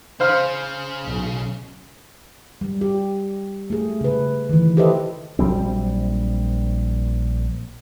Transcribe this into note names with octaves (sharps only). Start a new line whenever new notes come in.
C#3 C5 F5 C6
B1
G3
G4
A3 G#4
C#3 B4
D#3 E3
G4 A4 B4 C5 D#5 E5
A#1 F#3 G3 C4